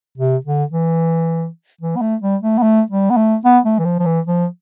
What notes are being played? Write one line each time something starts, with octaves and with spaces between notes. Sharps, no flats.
C3
D3
E3
E3
B3
A3
G3
A3
B3
A3
G3
B3
A3
B3
A3
E3
F3
F3
E3
F3